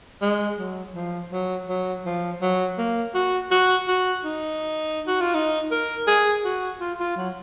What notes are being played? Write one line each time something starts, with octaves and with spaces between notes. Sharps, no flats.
G#3
F#3
F3
F#3
F#3
F3
F#3
A#3
F#4
F#4
F#4
D#4
F#4
F4
D#4
A#4
G#4
F#4
F4
F4
F#3